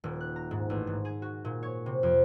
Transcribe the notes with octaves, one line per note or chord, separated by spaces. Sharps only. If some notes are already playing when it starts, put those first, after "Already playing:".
D#1
F#6
A#5
G#2
A1
G#2
G#4
F#4
A#2
C#5
C3
F2